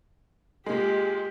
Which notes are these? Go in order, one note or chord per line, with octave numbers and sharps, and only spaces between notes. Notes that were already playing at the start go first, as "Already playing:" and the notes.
A#2 G#3 G4